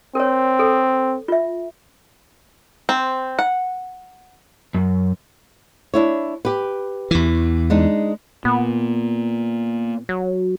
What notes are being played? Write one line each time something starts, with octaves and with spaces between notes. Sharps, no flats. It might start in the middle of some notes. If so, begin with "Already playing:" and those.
C4 A#4 C#5
A4
F4 E5
C4
F#5
F#2
D4 E4 C#5
G4 B4
E2 E3
G#3 D4 D#4
A#2 B3
F#3